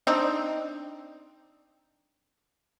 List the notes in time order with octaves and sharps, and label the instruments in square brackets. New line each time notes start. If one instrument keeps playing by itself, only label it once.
[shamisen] C4 D4 D#4